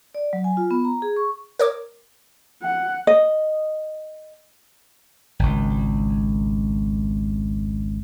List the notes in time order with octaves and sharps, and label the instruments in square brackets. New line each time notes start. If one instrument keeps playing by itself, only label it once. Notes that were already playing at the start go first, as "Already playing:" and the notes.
[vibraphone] D5
F#3
G#5
F4
B3
A#5
G#4
C#6
[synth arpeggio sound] A#4 C#5 D6
[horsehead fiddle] F#5
[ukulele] D#5
[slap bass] G#1 C#2